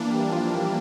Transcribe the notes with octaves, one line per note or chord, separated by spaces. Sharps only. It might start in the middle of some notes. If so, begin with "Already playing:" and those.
Already playing: E3 A#3 D4
G3 G4
F3 F4
G3 G4